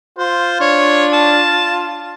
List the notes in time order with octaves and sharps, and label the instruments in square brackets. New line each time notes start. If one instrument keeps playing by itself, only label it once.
[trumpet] F4 [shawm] C5
[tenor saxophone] D4 [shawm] C#5
[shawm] A5